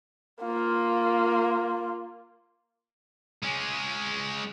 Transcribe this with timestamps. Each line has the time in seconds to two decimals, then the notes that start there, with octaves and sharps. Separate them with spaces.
0.43 A#3 F4
3.43 G#3 C#4